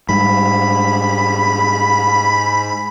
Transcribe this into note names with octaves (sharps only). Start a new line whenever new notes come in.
G#2 G3 B5